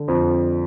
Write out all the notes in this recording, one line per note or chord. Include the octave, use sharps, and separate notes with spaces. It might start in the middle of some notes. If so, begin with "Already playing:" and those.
Already playing: D3
F2